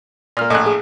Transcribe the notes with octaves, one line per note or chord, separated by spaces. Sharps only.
A#2 A#3 A#5 F6
A#1 A2 D#5 G#5 F#6
G#4